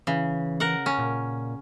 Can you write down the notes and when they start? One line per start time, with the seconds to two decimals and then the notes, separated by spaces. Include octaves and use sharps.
0.07 C#3 E3
0.60 A#4 F#5
0.86 C#4
0.98 A#2